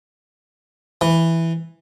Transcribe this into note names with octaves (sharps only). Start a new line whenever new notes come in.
E3